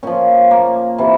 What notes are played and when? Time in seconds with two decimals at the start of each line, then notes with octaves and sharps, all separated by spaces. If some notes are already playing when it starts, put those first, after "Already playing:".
0.03 A#2 F3 C#4
0.51 A#3
0.98 C3 E3